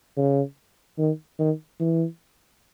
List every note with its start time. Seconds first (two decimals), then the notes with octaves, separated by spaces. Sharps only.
0.17 C#3
0.98 D#3
1.39 D#3
1.80 E3